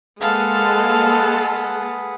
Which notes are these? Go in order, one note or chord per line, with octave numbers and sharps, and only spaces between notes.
G#3 A#3 G#4 A4 B4 F5 F#5